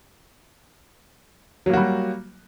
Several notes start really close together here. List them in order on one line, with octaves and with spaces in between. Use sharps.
F#3 A#3 F#4 G3